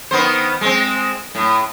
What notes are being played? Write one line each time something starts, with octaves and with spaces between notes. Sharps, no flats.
D#3 B3 C5
G#3 C4
A2